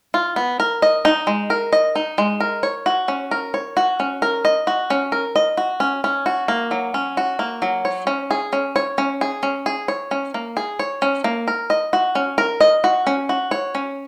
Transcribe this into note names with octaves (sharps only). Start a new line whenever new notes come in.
F4
B3
A#4
D#5
D#4
G#3
A#4
D#5
D#4
G#3
A#4
C#5
F#4
C#4
A#4
C#5
F#4
C#4
A#4
D#5
F#4
C#4
A#4
D#5
F#4
C#4
C#4
F#4
A#3
F#3
C#4
F#4
A#3
F#3
C#5
C#4
G#4
C#4
C#5
C#4
G#4
C#4
G#4
C#5
C#4
A#3
G#4
C#5
C#4
A#3
A#4
D#5
F#4
C#4
A#4
D#5
F#4
C#4
F#4
C#5
C#4